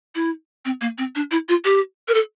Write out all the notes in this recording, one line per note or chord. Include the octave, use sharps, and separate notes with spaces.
E4
C4
A#3
C4
D4
E4
F4
G4
A#4
A4